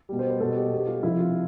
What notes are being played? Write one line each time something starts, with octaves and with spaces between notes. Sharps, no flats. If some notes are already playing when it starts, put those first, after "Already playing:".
B2 G3
C5
B4
B2 G3 A4
G4
B2 G3
G4
F4
C3 F3 E4
F4